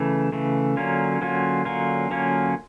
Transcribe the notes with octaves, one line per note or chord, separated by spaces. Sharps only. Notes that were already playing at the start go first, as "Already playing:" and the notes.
Already playing: C#3 E3 A3
C#3 E3 A3
D3 F#3 A#3 C#4 F4
D3 F#3 A#3 C#4 F4
D3 F#3 A#3 C#4 F4
D3 F#3 A#3 C#4 F4